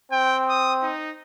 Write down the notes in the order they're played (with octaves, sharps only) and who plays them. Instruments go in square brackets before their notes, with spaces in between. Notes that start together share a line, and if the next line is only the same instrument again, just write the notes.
[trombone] C4 [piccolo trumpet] G5
[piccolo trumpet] D#6
D#4